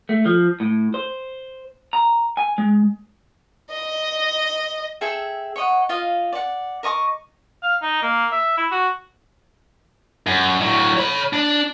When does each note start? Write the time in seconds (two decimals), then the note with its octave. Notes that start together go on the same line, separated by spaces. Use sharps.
0.09 A3
0.26 F3
0.60 A2
0.94 C5
1.93 A#5
2.37 G#5
2.58 G#3
3.71 D#5
5.01 G#4 A4 E5 G5
5.56 C#5 D#5 F#5
5.89 F4 D#5 F5
6.33 D5 F#5
6.83 A#4 D#5 C#6 D6
7.63 F5
7.82 D#4
8.02 A#3
8.32 E5
8.57 E4
8.71 F#4
10.27 F#2
10.61 A2 F#3
10.97 C#5 B5
11.33 D4